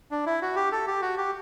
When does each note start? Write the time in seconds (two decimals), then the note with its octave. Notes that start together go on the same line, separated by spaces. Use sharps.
0.11 D4
0.26 E4
0.42 F#4
0.56 G4
0.72 A4
0.87 G4
1.02 F#4
1.17 G4